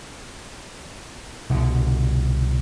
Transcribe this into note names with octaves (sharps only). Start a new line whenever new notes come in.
C2 B2 D3